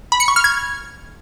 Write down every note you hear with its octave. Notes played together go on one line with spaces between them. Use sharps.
B5
C#7
C#6
F6
G#6